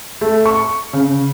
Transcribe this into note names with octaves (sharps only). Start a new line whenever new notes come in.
A3
C#6
C#3